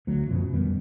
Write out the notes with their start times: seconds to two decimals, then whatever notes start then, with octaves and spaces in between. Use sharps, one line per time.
0.07 D2 F#3 A3
0.28 F#2 B2 F3
0.53 F2 D#3 G3 B3